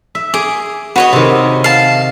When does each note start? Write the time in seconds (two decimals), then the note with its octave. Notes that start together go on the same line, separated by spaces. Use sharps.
0.15 E5
0.34 G#4 D6
0.96 F#4 B4 C#5 D#5
1.13 C3 D#3
1.64 F5 A5